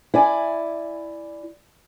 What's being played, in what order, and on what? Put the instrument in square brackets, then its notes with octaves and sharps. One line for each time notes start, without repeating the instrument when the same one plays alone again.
[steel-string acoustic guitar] E4 D5 G#5